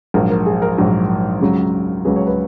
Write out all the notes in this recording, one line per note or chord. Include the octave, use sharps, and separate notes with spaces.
A#1 G#2 F#3 A#4
A#4
G#4
A#4
A#1 G#2 F#3
C#2 C#3 F#3
C#2 C#3 F#3 G#4 B4
C#5
B4